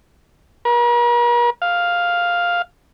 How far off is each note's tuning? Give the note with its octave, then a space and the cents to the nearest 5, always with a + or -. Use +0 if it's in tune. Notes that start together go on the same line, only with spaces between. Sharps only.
A#4 +45
F5 +5